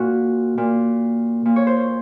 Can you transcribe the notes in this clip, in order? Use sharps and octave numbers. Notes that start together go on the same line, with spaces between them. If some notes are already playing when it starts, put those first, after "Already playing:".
Already playing: A#2 F#4
A#2
A#2
C#5
C5